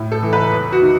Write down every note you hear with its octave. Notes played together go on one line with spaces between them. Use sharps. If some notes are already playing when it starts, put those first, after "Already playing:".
Already playing: A2
A4
E3
B4
E2
F#4
D#3